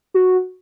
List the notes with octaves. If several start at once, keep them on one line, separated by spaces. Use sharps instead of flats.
F#4